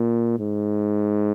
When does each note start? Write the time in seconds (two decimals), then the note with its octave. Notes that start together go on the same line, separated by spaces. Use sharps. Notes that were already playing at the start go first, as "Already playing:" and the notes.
Already playing: A#2
0.40 G#2